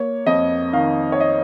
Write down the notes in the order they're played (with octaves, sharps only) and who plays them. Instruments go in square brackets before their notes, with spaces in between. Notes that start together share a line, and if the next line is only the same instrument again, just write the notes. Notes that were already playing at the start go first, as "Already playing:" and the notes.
Already playing: [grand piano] A#3 C#5
F2 D#5
D#3 F5
C#5
D#5